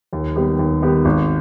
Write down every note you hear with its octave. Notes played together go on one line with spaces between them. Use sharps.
D#2
D#3 G3 B3 G4
D#2
D#3 G3 B3 G4
G#1